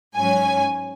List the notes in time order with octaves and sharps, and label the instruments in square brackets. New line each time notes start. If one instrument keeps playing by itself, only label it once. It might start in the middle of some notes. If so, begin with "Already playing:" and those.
[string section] G#2 F#3 C#4 G#5